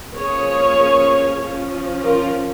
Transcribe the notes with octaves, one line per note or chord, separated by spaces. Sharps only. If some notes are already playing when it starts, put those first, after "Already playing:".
F3 A#3 C#4 G#4 C#5
F3 C#4
F4 A#4